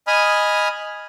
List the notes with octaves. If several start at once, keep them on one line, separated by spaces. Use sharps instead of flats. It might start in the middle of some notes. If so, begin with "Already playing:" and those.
D#5 G#5 B5 D#6 F6